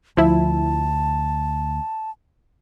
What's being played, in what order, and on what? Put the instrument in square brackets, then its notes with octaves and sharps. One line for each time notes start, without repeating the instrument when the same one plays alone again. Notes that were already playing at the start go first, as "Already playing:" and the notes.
[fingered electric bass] D2 [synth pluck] F3 E4 [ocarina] A5